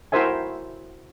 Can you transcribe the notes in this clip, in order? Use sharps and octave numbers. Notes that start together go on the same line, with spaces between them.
E4 F#4 A#4 C5 E5 G#5